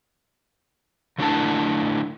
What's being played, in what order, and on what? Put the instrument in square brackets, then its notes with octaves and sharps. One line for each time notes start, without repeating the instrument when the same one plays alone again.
[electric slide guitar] D3 A3 D4 E4 A#4 A5